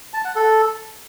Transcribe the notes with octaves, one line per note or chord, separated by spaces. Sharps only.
A5
F#5
A4